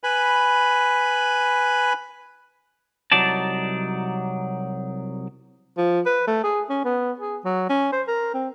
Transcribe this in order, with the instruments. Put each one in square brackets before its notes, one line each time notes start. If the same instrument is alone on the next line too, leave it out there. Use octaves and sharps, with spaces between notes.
[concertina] B4 G#5 B5
[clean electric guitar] C2 F#3 D#4 D5 A5
[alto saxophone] F3
B4
A3
G#4
C#4
B3
G#4
F#3
C#4
C5
A#4
C4